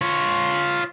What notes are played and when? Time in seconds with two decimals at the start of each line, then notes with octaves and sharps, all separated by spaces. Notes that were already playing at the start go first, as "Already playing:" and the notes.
0.01 F4 C#5